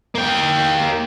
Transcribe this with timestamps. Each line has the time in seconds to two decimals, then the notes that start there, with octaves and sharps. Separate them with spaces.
0.15 A#3 G5